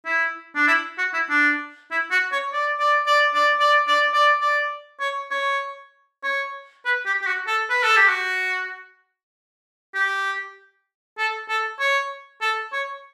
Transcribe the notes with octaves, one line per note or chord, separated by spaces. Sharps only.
E4
D4
E4
F#4
E4
D4
E4
F#4
C#5
D5
D5
D5
D5
D5
D5
D5
D5
C#5
C#5
C#5
B4
G4
G4
F#4
A4
B4
A4
G4
F#4
G4
A4
A4
C#5
A4
C#5